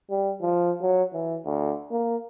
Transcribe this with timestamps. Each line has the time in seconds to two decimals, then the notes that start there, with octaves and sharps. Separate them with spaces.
0.10 G3
0.42 F3
0.81 F#3
1.13 E3
1.45 D2
1.91 A#3